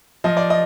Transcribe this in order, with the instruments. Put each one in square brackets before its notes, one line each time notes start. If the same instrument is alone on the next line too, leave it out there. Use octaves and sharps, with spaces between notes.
[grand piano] F3 D#5
D5
D#5